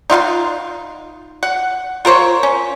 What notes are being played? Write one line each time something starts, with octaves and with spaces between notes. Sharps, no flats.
D#4 F4 F5 C6
F#5
F4 A#4 C5 C#5
C#4